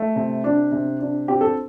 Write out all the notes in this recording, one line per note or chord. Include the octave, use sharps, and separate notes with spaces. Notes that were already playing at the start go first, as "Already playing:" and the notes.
Already playing: A3
C3
D4
C3
D4
C4 G4
A4